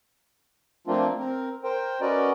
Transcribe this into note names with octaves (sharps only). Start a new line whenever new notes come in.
F3 A3 A#3 C4 D4 F4
C4 A#4
A#4 C5 G5
C#4 F#4 A#4 B4 D5 D#5